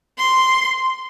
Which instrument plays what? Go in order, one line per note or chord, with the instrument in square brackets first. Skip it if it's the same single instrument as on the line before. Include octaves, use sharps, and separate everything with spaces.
[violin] C6